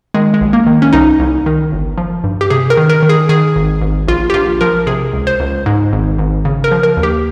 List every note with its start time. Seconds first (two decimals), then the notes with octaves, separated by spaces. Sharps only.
0.14 D#3 G#3
0.34 G#3
0.41 A#1
0.53 A#3
0.67 D#3
0.82 C#4
0.93 C2 D#4
1.20 C2
1.46 D#3
1.72 G1
1.98 F3
2.24 G2
2.41 G4
2.50 C3 G#4
2.70 A#4
2.77 D#3
2.89 A#4
3.03 D#3
3.09 G#4
3.29 D#3 G#4
3.56 G#1
3.82 G#1
4.08 A#1 F4
4.30 G4
4.34 A#1 F4
4.61 F3 A#4
4.87 C3 G#4
5.13 C#2
5.27 C5
5.40 C#2
5.66 G#2
5.93 G#1
6.19 G#1
6.45 C#3
6.64 A#4
6.71 F3
6.83 A#4
6.97 D#2
7.03 G4